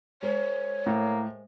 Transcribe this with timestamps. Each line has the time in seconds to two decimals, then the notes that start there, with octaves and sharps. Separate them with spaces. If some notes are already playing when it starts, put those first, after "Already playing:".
0.23 G#3 A#4 C5 C#5
0.86 A2 A#3